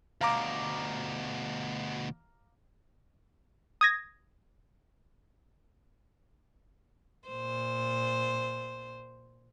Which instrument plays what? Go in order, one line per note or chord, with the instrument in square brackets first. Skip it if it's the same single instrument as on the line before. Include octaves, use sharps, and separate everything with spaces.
[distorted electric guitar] D2 B2 [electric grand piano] F5 A#5 D6
[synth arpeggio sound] D#6 G#6 A#6
[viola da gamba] A#2 C5